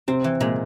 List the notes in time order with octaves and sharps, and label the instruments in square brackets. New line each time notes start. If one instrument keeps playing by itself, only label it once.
[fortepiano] C3 [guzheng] C4
[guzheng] E3
[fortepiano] A#2 [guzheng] G#3